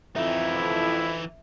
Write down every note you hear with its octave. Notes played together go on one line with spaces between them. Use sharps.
F2 E3 D#4 E4 E5